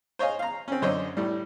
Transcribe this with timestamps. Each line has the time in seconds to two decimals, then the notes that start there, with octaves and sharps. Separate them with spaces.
0.19 C5 C#5 D#5 F5 G#5
0.39 F5 A#5
0.68 C4 C#4
0.82 F#2 D3 C5 C#5 D#5
1.17 A2 G3